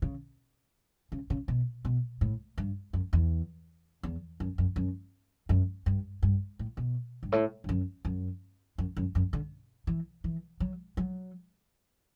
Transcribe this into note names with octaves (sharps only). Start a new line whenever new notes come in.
C#3
C#3
C#3
B2
B2
A2
G2
F#2
E2
E2
F#2
F#2
F#2
F#2
G2
G2
A2
B2
G2
A2
G2
F#2
F#2
F#2
F#2
F#2
D3
E3
E3
F#3
F#3